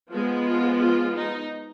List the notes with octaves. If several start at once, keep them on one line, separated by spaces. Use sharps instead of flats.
F3 G#3 B3
F4
F4
D#4